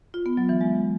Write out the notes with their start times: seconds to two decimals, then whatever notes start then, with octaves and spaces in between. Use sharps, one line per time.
0.14 F4
0.26 B3
0.37 F#3
0.49 E3
0.61 G#3